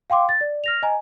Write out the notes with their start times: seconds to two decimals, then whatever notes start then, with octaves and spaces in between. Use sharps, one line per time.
0.10 F5 G5 C6 D6
0.29 A6
0.41 D5
0.64 F6 A#6 F7
0.82 D#5 G#5 A#5